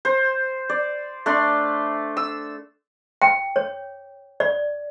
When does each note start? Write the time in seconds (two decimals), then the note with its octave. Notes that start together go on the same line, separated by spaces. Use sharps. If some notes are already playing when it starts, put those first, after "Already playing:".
0.05 C5
0.70 D5
1.26 A3 D4 D5 C6
2.17 E6
3.22 G5
3.56 C#5
4.40 D5